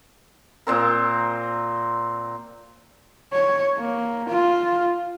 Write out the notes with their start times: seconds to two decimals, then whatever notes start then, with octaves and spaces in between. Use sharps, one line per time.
0.67 A#2 C4 A#4
3.33 C#5
3.78 A#3
4.30 F4